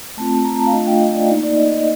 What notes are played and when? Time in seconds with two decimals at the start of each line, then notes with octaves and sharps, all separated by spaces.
0.17 A3 C4 F4 A5
0.31 A5
0.45 A#5
0.59 A5
0.66 F5
0.73 A3 D4 F4 D#5
0.87 G5
1.01 D#5
1.15 D5
1.28 A#3 D#4
1.43 D5
1.56 D#5
1.71 D#5